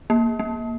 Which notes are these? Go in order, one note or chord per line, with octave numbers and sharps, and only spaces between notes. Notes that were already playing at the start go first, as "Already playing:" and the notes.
A#3
A#3